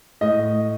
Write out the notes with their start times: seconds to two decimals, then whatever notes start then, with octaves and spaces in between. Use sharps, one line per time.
0.21 A2 D#5